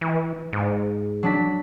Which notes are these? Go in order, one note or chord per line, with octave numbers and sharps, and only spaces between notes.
E3
G#2
F#3 D4 B6